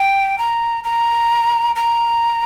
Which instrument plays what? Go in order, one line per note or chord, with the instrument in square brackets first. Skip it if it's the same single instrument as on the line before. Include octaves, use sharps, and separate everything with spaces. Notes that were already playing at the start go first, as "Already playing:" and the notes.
Already playing: [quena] G5
A#5
A#5
A#5